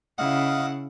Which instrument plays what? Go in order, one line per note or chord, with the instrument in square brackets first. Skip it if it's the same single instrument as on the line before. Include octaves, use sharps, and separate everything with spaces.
[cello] C#3 E4 [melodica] D#5 F5 [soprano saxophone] F#5